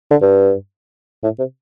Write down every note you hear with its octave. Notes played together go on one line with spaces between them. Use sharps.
D3
G2
A2
C3